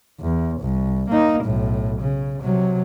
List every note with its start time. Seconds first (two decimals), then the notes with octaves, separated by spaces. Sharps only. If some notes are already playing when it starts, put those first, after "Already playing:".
0.20 E2
0.61 C2
1.10 A#3 D#4
1.44 B1 A2
2.01 C#3
2.41 C3 F#3